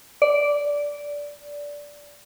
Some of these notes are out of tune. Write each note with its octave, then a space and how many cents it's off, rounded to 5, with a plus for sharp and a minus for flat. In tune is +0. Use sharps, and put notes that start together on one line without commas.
D5 -10